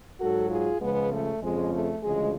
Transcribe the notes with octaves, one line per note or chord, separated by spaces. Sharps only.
G#2 F#3 F#4 A4
F4 G#4
C#2 C#3 F3 G#3 B3
A3
F2 C#3 F3 G#3
A3
D2 C#3 F3 G#3